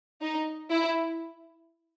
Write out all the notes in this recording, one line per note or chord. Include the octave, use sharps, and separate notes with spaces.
D#4
E4